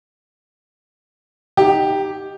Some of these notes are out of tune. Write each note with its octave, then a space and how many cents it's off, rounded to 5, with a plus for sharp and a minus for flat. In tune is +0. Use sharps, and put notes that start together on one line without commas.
D#4 +0 G4 +0